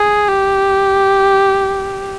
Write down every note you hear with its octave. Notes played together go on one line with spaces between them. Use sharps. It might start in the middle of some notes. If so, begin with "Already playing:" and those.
Already playing: G#4
G4